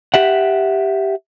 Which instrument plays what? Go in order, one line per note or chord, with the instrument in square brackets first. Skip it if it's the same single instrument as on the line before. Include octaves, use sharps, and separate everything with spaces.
[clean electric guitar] G4 E5 F#5